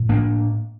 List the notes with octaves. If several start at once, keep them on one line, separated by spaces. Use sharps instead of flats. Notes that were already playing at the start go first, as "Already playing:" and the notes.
Already playing: A2
A#3 D4